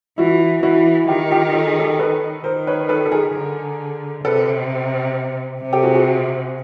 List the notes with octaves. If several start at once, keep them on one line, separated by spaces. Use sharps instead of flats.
E3 E4 F#4
E3 E4 F#4
D#3 F4 G4
F4 G4
A4
G#4
G4 A4
A4 B4
D#3 A#4 C5
B4 C#5
A4 B4
A4
G#4 A#4
D3
C3 A4 B4
C3
G4 A4
F#4 G#4
F#4 G#4